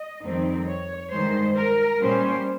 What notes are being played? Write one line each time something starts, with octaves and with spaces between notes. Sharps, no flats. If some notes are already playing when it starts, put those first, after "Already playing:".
Already playing: D#5
F2 D#3 G3 C4 D#4
C#5
G2 D#3 G#3 C5
A#4
A#2 G3 C#4 C5